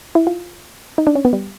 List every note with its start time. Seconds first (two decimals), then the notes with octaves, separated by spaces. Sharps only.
0.15 E4
0.27 F4
0.98 D#4
1.07 D4
1.15 C#4
1.25 B3
1.33 G3